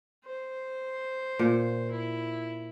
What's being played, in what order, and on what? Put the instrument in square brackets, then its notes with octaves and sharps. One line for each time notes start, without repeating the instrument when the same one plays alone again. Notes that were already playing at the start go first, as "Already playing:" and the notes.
[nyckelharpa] C5
[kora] A#2
[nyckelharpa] E4